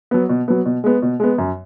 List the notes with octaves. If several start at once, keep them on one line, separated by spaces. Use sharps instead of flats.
F#3 B3
B2
F#3 B3
B2
G#3 B3
B2
G#3 B3
F#2